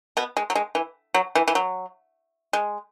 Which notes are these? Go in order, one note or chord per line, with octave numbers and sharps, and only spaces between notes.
B2 B3
G#3
F#3
G#3
E3
F#3
E3
E3
F#3
G#3